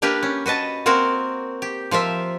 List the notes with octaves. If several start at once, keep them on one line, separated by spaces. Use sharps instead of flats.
A#3 D4 G4 A#4 B4
C#4
F#4 B4 D#5 A5
A#3 C4 F#4 A#4 C5
G4
F3 F4 A#4 E5